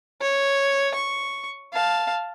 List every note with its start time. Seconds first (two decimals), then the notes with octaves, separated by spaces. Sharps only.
0.21 C#5
0.95 C#6
1.73 F5 A5